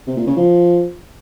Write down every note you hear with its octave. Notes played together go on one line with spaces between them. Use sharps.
C3
A#2
C#3
F3